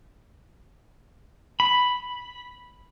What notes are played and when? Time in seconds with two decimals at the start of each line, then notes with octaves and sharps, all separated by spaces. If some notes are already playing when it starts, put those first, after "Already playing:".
1.60 B5